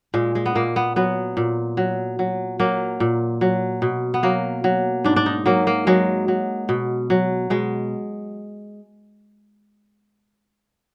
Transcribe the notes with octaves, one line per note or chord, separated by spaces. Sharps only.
A#2 G#3
G#3
B3
A#2 A#3
B3
F#3 B3
A#2
F#3
F#3
F#3 A#3
A#2
F#3
B2
B3
F#3 A#3
F#3
G#2 D4
D4
D#4
F#3 A#3
A#3
F#3 G#3
F#3
B2
F#3
B2 G#3